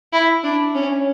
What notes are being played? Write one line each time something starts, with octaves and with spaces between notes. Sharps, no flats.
E4
D4
C#4